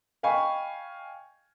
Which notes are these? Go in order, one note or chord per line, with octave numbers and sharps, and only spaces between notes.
D#5 F5 G5 G#5 B5 C#6